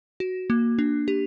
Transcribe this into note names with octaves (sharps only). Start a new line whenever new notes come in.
F#4
A#3
D4
G4